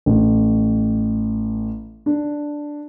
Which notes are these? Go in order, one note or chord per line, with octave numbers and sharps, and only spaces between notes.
A1
D4